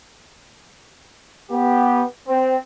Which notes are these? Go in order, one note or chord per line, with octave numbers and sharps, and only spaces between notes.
B3 G4
C4